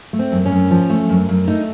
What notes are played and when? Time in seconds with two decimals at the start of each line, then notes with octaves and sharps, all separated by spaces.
0.13 A3
0.19 C4
0.32 F#2
0.45 C#4
0.51 F#2
0.71 F3
0.90 A3
1.09 F#2
1.29 F#2
1.47 A3 D#4